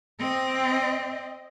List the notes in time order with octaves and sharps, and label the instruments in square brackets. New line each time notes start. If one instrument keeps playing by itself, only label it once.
[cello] C4 D#5